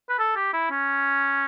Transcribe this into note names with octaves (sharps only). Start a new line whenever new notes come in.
B4
A4
G4
E4
C#4